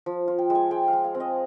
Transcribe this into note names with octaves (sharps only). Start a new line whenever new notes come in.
F3
F4
G5
G#3
G#5
G#3 G5
F5
G#3
F5
C4
D#5